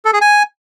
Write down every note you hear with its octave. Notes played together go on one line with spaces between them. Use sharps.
A4
G#4
G#5